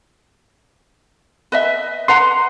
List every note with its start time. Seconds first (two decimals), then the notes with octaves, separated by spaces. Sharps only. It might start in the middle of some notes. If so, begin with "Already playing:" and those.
1.52 B4 D#5 E5
2.08 B4 F#5 A#5 C6